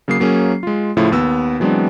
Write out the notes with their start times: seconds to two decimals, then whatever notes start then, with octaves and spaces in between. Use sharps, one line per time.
0.08 C#3 F#3 A#3 D#6 C7
0.20 F#3 A#3 C#4 G#4
0.63 G#3 F4
0.97 A2 C#3 F3 A3 E4 F4
1.12 D#2 B3 E6
1.60 E3 F#3 G#3 B3 C4 D4